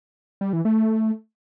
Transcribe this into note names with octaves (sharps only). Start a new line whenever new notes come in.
G3
E3
A3